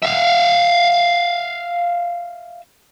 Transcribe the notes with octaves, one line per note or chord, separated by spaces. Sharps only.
E5 F5